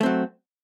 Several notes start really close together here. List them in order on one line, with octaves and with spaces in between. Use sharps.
A3 C4 F#3